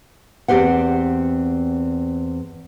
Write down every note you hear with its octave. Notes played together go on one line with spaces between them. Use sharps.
E2 C4 G4 C5 F#5